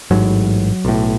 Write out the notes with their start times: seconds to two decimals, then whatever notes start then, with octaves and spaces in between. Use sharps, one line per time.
0.11 A1 G#2 F#3
0.85 B1 A2